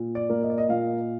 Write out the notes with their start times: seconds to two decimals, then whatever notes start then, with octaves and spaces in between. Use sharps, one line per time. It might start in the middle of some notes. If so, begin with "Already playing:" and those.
Already playing: A#2
0.15 D5
0.30 A#3
0.43 D#5
0.50 D5
0.58 D#5
0.69 A#2 F5